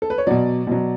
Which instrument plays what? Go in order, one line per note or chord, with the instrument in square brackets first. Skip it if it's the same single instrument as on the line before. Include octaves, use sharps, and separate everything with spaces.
[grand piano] A4
B4
C#5
B2 F#3 D5
B2 F#3